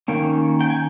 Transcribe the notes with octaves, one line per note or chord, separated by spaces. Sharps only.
D#3 A#3 C#4 G5
G5
G#5